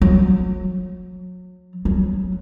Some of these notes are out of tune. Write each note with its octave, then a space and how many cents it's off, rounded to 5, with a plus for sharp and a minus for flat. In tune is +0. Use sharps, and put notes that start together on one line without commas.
F#3 -25
F#3 +0